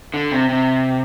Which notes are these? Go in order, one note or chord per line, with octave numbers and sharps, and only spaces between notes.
D3
C3
C3